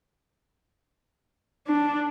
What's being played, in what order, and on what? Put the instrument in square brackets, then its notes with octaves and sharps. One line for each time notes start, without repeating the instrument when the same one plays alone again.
[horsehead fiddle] D4